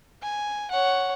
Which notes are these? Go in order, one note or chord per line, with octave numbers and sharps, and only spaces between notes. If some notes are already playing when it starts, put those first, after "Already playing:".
G#5
C#5 F#5